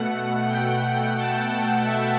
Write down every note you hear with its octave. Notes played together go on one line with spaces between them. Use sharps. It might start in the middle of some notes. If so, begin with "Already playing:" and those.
Already playing: B2 A3 F#5
G5
A5
G5
E5